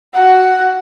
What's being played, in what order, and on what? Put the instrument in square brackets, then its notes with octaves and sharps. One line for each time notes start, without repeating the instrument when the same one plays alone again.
[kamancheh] F#4 F#5